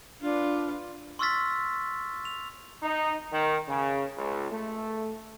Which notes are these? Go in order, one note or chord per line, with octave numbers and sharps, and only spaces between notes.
D4 F4 B4
C6 C#6 E6 F6 A6 B6
F7
D#4
D#3
C#3
C#2
A3